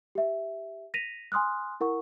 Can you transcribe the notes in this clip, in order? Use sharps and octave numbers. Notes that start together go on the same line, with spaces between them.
G4 E5
A#6 B6 D#7 F7
G#5 C6 D#6 F6 F#6
E4 A#4 F#5 C#6